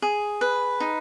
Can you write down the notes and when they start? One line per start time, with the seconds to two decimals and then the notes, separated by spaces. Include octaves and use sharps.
0.02 G#4
0.41 B4
0.80 D#4